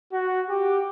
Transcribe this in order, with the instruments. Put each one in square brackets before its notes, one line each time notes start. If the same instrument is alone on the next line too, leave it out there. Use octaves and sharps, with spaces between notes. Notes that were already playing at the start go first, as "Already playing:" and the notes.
[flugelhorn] F#4
G4